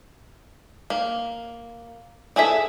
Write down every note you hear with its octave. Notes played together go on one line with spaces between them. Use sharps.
A#3
E4 G#4 A4 E5